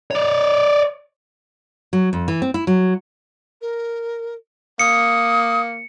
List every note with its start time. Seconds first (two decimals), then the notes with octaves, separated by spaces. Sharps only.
0.11 C#5 D5
1.93 F#3
2.13 F2
2.28 E3
2.42 C4
2.54 E4
2.67 F#3
3.61 A#4
4.79 A#3 D#6 C#7